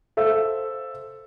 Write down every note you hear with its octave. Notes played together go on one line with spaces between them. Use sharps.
A4 C5 E5 F5 E6